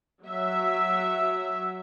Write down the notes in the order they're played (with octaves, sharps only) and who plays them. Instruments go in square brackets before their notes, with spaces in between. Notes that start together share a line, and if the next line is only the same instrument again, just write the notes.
[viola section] F#3 E5